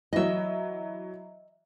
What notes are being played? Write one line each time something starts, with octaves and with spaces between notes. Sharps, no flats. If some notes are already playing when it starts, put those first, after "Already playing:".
E3 F#3 D#5 E5